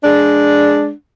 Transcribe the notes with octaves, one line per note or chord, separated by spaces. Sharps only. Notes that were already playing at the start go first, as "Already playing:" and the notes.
G#3 D4